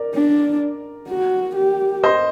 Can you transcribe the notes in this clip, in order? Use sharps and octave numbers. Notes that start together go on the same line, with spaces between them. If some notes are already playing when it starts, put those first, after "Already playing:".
Already playing: A#4 D5
D4
F#4
G4
C5 D#5